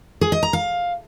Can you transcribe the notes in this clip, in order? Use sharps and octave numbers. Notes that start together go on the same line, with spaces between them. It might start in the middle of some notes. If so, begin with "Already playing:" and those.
G#4
D#5
A#5
F5